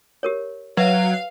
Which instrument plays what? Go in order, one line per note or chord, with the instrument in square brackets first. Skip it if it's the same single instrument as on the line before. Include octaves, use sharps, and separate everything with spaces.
[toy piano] G4 A#4 C#5
[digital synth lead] F#3 [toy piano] B4 E5 [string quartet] F5